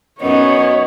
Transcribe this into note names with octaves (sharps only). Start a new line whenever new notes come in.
F#2 B3 D#4 C#5 D#5